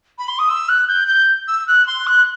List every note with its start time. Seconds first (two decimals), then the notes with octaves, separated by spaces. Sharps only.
0.18 B5
0.28 C6
0.39 D#6
0.49 E6
0.69 F#6
0.88 G6
1.08 G6
1.48 E6
1.68 F#6
1.87 C6
2.07 F#6